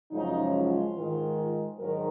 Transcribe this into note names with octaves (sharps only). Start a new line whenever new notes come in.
F#2 C#3 F3 G#3 D#4
F4
G#2 D#3 G#3
G#2 D#3 F#3 A#4